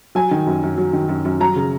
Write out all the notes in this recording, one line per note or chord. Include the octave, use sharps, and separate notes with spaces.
F#3 G#5
D#3
F#2
F#2
F#3
D#3
F#2
F#2
F#3 A#5
C#3